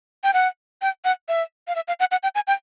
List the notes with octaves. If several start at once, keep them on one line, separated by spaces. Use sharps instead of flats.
G5
F#5
G5
F#5
E5
F5
E5
F5
F#5
F#5
G5
G#5
G5